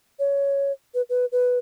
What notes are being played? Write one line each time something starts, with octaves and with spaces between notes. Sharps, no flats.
C#5
B4
B4
B4